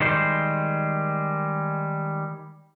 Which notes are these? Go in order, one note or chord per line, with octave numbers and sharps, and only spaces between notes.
D#3 G3 G#3 C5